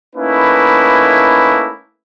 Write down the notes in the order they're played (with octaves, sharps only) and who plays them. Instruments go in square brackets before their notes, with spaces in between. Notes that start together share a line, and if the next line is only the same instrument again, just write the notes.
[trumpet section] A3 A#3 C#4 D#4 E4 B4